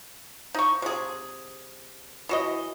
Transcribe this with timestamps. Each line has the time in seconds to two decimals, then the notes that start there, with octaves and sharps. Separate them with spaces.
0.54 D#4 C#6
0.82 C3 G#4
2.29 E3 F#4 D#5